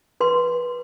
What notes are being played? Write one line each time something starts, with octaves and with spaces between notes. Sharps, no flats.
B4 C6